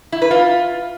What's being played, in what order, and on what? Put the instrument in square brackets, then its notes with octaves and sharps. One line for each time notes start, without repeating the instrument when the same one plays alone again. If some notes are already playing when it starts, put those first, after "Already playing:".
[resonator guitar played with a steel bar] E4
B4
F4